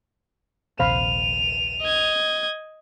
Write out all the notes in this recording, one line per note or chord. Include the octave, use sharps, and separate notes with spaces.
A#1 D#2 C3 C5 F5 B5 D#7 F7
D#5 G#6